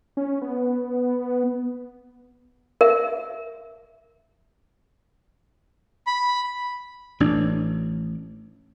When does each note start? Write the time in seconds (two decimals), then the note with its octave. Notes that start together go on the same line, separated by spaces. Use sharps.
0.17 C#4
0.42 B3
2.81 A#4 E5
6.07 B5
7.20 A1 D4